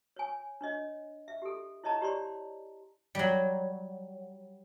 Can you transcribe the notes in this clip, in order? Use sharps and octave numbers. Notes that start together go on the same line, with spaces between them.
C#5 G#5
D4 C#5 D#5
E5
G4 A4
E4 C#5 D#5 A5 A#5
G4 C#5 D5 C6
F#3 G3